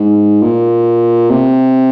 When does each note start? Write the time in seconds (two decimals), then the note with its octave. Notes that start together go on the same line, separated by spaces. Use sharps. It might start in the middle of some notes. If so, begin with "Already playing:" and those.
Already playing: G#2
0.43 A#2
1.30 C3